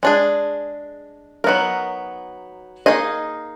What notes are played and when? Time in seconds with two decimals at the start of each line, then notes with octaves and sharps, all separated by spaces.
0.03 G#3 D4 G#4
1.44 F#3 B3 D#4 A#4
2.86 A#3 D#4 G#4 D#5